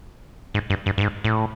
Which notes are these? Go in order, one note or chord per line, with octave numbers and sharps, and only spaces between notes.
G#2
G2
G2
G2
G#2
A2